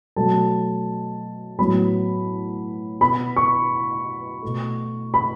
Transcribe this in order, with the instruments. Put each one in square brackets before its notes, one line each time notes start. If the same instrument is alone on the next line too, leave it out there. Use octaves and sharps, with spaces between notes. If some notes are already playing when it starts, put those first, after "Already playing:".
[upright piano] B2 F#3 A3 A5
A2 F#3 B3 B5
B2 B3 B5
C#6
B2 A3
B5